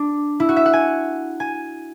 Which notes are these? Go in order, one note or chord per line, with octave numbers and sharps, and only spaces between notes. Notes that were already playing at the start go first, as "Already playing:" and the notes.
Already playing: D4
E4
F#4
E5
F#5
G#5
G#5